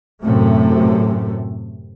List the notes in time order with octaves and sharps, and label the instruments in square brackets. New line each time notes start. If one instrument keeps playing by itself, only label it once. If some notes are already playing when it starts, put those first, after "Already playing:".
[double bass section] F#2 A2 C3 A3